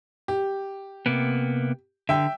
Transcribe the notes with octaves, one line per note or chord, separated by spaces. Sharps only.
G4
C3 A#3 B3
D3 E5 G5